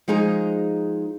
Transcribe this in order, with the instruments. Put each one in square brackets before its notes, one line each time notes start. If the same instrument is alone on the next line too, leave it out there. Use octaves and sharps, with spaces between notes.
[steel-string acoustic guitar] F3 G#3 D#4 G#4 A#5